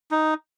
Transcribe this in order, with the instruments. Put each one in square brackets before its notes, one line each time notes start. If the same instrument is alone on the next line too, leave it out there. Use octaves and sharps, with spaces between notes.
[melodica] D#4